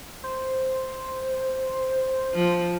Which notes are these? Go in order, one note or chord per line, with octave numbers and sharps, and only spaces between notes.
C5
F3